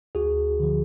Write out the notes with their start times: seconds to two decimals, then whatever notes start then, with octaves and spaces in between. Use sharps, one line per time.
0.15 D2 F#4 G#4
0.60 D3 F3